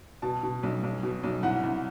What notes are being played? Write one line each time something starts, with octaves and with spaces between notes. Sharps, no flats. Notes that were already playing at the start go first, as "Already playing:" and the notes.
B2 A5
B2
B1
B1
B2
B1
C2 F#5
C2